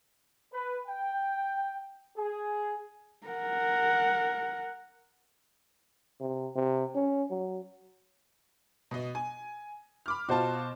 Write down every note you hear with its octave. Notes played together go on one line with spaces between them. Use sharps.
B4
G5
G#4
A#4 F#5
C3
C3
C#4
F#3
B2 D#5
G#5
B5 D6 F6
B2 F4 F#4 C5 A5